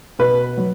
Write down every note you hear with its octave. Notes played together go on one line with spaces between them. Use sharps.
B2 B4
F#3